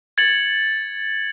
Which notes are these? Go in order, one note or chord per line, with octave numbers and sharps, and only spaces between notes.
G#6 A6 C#7 F#7